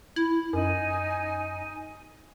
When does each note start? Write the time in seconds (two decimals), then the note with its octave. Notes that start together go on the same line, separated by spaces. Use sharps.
0.16 E4
0.53 F#2 D#4 G#5